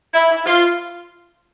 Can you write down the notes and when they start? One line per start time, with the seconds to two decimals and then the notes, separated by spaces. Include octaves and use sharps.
0.14 E4
0.30 E4
0.46 F4